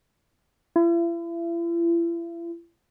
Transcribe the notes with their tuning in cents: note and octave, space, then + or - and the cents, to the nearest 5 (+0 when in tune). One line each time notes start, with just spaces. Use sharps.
E4 +40